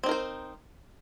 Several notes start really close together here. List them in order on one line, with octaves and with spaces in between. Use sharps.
C4 D#4 A#4 C5